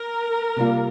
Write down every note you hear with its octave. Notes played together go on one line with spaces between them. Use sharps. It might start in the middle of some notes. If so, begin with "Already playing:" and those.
Already playing: A#4
C3 G3 A#3 F4